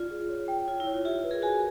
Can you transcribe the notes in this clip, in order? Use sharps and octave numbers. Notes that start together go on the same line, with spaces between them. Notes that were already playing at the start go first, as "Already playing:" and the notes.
Already playing: F4 D5
G#4
C#5
G5
F4 C#5
E4
C#5
F4
F4 G4 E5
B4
G#4 A#4
F#4 G#4 G#5